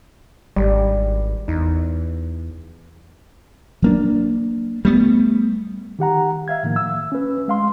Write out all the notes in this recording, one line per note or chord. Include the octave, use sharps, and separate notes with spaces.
G#1 G3
E2 D#4
F#3 A#3 D4
G3 A3 B3
D#3 G4 F#5 A#5
E5 F5 G#6
A2 D#3 F3 A#3
E6
C#4 B4
G#3 F5 C6